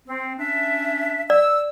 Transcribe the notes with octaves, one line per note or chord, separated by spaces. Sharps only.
C4
C#4 D4 E5
D5 E6